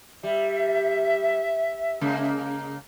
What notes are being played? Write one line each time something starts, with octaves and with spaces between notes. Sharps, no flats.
G3 E5
C#3 G#3 A#3